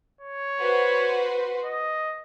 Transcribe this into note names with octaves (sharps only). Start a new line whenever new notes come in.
C#5
F#4 B4 C5
D#5